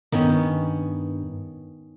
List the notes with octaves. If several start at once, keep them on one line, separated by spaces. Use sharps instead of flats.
G2 D#3 B3 C#4